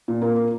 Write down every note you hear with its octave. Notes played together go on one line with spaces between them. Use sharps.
A#2
A#3